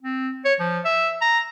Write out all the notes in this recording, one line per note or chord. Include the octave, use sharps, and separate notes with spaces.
C4
C#5
F3
E5
A#5